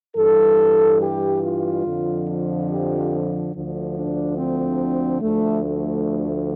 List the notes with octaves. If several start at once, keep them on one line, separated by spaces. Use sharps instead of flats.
G2 E3 G3 A4
G4
F4
F2 D3 F3
F4
G4
D2 D3 F3
D4
C4
D2 D3 F3 A3
A3